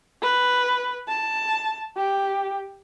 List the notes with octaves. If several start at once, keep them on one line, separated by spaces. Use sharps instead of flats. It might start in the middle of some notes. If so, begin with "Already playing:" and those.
B4
A5
G4